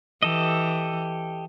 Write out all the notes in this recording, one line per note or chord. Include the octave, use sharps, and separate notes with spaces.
E3 G4 A4 D#5